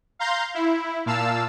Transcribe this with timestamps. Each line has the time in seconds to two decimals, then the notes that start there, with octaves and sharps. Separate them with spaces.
0.19 F5 A#5 C6 G6
0.54 E4
1.06 A#2 F5 A5 E6